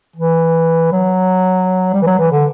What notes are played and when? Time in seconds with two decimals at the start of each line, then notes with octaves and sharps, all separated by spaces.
0.16 E3
0.92 F#3
1.94 G3
2.02 E3
2.06 F#3
2.19 E3
2.32 D3